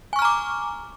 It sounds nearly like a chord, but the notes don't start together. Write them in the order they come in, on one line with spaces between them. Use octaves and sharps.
G#5 C#6 F6 A#5 D6